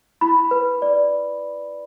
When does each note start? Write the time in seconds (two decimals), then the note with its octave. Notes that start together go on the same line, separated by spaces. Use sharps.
0.21 E4 B5
0.51 B4
0.82 D5